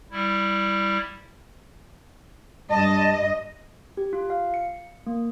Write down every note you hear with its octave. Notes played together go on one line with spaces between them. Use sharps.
G3 E4
G2 D#5 A5
G4
F4
F5
C#7
A#3